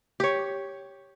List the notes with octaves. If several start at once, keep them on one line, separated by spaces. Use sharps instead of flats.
G4 C#5